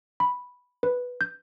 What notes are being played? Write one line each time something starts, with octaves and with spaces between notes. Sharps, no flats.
B5
B4
G6